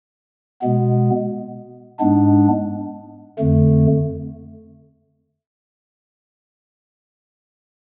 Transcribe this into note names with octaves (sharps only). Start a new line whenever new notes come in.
B2 G#3 B3
G#2 G#3 B3 D4
F2 D3 A3